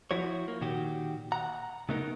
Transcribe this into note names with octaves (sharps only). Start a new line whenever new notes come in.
F3 E4 F#4 C#5
A#3
A#2 D#3 F#4 G4
F#5 A#5
C#3 A3 B3 D#4 A#4